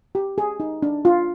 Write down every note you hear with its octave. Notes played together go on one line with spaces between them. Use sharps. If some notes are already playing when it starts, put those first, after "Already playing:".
G4
G#4
D#4
D4
F4